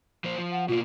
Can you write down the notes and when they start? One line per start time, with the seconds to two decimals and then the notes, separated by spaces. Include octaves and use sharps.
0.24 F3 A#3 C5
0.38 F3
0.51 F#5
0.68 B2 A#3 F4